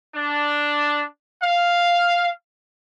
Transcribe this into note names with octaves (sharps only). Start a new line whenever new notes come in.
D4
F5